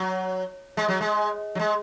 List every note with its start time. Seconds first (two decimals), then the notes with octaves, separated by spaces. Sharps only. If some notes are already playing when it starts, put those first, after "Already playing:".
Already playing: F#3
0.77 G#3
0.88 F#3
1.01 G#3
1.55 F#3
1.60 G#3